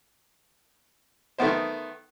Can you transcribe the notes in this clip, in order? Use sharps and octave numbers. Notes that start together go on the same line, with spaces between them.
D#3 A3 B3 C5